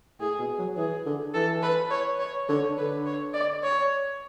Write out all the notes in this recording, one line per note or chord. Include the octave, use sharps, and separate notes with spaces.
A2 G#4
B2
F#3
E3 G#4
D3
E3 A4
B4
C#5
C#5
D3 C#5
D3 B4
C#5
D5
C#5